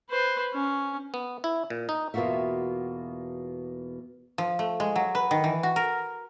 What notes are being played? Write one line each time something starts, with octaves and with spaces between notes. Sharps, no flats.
B4 C5
C#4
B3
E4
A#2
D#4
E2 B2 A#3 F4 F#4 E5
F3
A3
G#3
F#3
B4
D#3
E3
F#4
A#4